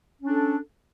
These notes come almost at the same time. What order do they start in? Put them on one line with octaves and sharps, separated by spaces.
C#4 D4 A4